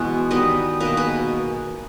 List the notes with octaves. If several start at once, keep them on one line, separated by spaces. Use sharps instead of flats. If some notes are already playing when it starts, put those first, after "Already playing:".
Already playing: B2 E3 G#3 B3
D#3 G3 B3 B4 D#5
B2 A#3 B4 D#5
G#4 B4